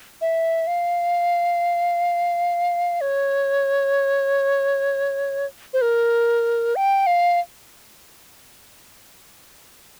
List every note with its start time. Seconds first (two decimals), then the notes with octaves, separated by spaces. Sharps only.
0.21 E5
0.67 F5
3.01 C#5
5.73 C5
5.82 A#4
6.76 G5
7.07 F5